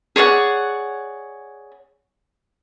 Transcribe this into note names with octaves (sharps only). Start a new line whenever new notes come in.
G#4 C#5 D5 F#5